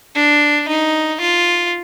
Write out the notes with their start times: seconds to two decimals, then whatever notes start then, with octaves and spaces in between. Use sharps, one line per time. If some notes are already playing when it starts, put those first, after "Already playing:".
0.16 D4
0.68 D#4
1.21 F4